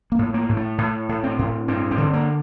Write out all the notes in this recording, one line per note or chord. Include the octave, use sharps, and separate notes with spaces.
A#3
A2
A#3
A2
A3
A2
A2
C4
A2
G2 C4
C4
D3
A#3